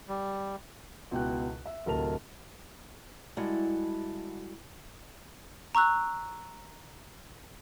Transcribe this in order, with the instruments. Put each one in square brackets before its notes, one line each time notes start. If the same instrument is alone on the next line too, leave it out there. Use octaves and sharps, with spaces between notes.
[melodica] G3
[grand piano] C#2 B2 E4 F#4 G5 F#6
E5
D1 C3 A#4 A5 F7
[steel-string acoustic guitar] G3 G#3 E4 F#4 A4
[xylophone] A#5 C#6 E6 F#6